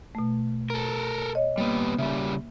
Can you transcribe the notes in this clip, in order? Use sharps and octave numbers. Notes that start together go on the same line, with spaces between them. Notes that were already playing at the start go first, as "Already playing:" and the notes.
B2 A3
A4 A#4
C#5 D#5
G3 A#3 B3
C#3 G3 E5